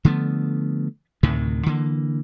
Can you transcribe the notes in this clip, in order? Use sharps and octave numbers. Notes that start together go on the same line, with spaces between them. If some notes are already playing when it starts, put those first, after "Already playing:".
D3 F3 A3 B3
D2 A2 C3 D#3
D3 E3 A#3